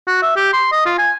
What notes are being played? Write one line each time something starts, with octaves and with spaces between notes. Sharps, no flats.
F#4
E5
G4
C6
D#5
F4
G#5